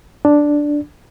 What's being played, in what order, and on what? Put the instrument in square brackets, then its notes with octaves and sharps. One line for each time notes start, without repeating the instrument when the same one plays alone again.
[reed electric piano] D4